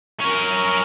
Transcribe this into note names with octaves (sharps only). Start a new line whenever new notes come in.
C#4 A#4